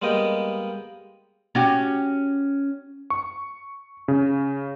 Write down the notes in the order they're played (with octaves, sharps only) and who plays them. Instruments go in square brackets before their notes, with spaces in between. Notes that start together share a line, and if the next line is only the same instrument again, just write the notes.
[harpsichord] G3 G#3 A#3 B3 D#5 G5
[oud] C#4 F#4 G4
[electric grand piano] C#6
C#3